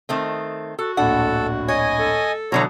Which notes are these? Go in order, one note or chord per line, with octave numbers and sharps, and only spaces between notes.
D#3 A3 C4
F#4 A4
D1 A#1 D4 A4 F#5
C#5 D#5 G#5
A4
B2 D3 E3 F#3 C#5 A#5 D#6